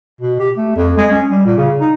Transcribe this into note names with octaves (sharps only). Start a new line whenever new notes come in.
B2
G4
A3
F2
G#3
C#4
G3
A#2
C#3
D#4